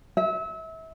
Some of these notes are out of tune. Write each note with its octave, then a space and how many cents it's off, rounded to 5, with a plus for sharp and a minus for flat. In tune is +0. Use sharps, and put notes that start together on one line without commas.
E5 -30